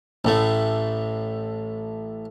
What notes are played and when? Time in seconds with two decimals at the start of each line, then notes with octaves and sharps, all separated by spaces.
0.25 A1 A2 A3